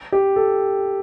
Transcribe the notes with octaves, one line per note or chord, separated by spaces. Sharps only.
G4
A4